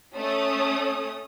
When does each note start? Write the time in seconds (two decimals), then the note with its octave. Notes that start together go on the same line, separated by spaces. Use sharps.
0.15 A3 C#4 D#6